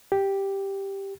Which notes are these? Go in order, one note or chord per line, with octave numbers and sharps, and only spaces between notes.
G4